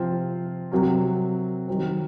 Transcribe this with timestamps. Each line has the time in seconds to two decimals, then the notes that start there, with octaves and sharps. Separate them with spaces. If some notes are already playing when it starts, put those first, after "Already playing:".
Already playing: C3 F3 C4 F4 C5
0.71 C3 F#3 C4 F#4 A#4
1.68 D#3 F#3 C4